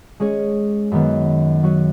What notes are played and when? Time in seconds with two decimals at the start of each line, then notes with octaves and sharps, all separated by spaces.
0.20 G#3 C#4 G#4 C#5
0.91 F#2 D#3 B3
1.63 F#3 C#4 F#4 C#5